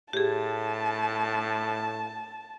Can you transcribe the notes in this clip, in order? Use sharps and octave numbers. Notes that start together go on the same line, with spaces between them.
A2 G4 G#4 A5